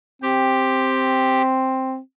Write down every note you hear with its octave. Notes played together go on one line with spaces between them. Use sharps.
C4 G4